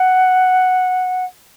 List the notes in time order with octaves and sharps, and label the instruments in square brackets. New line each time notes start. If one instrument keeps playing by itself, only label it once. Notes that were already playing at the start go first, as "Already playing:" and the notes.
Already playing: [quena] F#5